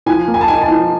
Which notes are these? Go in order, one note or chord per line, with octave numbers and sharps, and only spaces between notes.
F3 G#5
A#3
G#5
A5
D#4 G#5
A5
F3